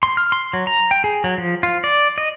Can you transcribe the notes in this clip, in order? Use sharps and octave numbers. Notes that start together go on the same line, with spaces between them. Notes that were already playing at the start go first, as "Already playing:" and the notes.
C6
F6
C6
F#3
A#5
G5
G#4
F#3
F3
F4
D5
D#5